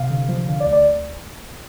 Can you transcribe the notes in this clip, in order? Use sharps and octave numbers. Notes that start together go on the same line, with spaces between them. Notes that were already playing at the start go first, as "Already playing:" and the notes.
Already playing: C3 F5
D3
F3
D3
D5
D2
D5